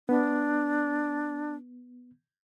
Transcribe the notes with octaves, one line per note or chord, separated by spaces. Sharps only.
B3 D4